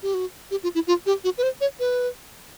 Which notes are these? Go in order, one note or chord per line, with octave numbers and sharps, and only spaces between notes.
G4
F#4
G4
F4
E4
F4
G4
F#4
B4
C5
C#5
B4